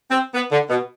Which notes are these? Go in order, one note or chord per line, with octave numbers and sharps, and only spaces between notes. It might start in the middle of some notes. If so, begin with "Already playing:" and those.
C4
B3
D3
B2